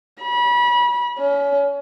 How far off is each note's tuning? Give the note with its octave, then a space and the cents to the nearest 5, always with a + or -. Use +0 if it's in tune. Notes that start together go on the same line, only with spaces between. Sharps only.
B5 -30
C#4 +30